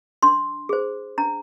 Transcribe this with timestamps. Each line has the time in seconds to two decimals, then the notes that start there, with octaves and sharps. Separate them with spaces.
0.23 D4 C6
0.69 G#4 C5
1.18 D4 A#5